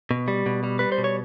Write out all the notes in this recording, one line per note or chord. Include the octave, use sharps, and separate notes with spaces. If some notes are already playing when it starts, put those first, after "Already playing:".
B2
G3
B2
G3
G3 B4
C5
B2
C#5